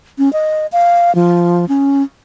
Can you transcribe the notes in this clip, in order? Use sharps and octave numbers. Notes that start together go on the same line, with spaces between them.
C#4
D#5
F5
F3
C#4